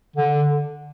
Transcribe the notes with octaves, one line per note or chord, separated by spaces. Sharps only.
D3